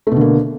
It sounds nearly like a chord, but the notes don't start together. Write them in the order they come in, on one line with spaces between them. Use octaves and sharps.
A3 B2 D3 A#3